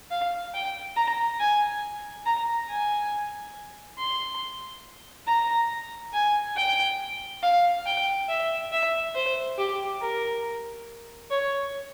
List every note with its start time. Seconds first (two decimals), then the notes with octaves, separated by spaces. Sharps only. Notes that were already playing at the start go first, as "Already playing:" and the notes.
0.11 F5
0.54 G5
0.96 A#5
1.40 G#5
2.26 A#5
2.69 G#5
3.98 C6
5.27 A#5
6.14 G#5
6.56 G5
7.43 F5
7.86 G5
8.29 E5
8.72 E5
9.15 C5
9.58 G4
10.01 A#4
11.30 C#5